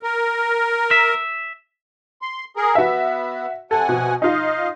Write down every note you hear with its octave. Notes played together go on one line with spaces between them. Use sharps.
A#4
E5
C6
G#4 A#4
B3 F#4 E5
C3 A4 F#5 G#5
B2
D#4 F4 D#5 F5